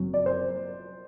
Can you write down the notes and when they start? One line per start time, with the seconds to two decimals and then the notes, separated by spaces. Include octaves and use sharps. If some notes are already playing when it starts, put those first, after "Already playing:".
Already playing: F#1 F#2 F#3 C4
0.14 D5
0.26 C5